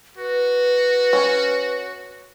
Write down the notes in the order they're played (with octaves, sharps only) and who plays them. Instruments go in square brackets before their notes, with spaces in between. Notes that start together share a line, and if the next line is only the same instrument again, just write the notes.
[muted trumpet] F#4 [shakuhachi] B4
[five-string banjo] C#4